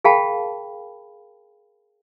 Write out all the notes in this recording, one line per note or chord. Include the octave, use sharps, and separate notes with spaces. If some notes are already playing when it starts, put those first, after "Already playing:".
G#4 A#4 F5 G5 A5 B5